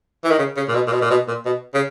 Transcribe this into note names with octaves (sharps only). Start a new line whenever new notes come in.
E3
D#3
C#3
C#3
A#2
B2
A#2
B2
A#2
B2
A#2
B2
C#3